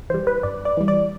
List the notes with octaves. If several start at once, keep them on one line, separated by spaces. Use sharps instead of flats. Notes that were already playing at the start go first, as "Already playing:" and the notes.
E3 G3 C5
B4
G2 D5
D5
E3 G3
D5